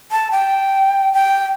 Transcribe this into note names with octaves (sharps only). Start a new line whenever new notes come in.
A5
G5
G5